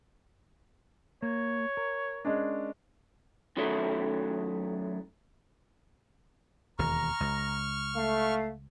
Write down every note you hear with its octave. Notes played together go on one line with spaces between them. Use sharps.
A#3 C#5
A#4
G#3 C#4 D4
F#2 D#3 F#3 A3 E4
E1 D#2 A#5 C#6 F6
C#2
A3 F5